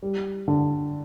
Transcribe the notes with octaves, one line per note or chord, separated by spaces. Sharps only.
G3
D3